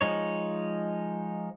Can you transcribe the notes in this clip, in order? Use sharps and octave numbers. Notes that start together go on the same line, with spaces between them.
F3 G#3 D#4 C#5